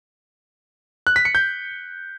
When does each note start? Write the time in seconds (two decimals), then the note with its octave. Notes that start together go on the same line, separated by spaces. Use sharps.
1.07 F#6
1.16 B6
1.25 C#7
1.35 G6